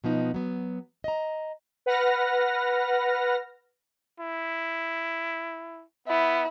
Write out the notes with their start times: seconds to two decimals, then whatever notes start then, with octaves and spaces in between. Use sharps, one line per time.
0.04 B2 F3 B3 D#4
0.34 F#3 B3
1.04 D#5 A#5
1.86 B4 F#5 F6 A#6
4.20 E4
6.08 B3 E4